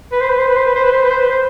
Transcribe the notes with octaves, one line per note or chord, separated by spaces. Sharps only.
B4
C5
B4
C5
B4
C5
B4
C5
B4
C5
B4
C5
B4
C5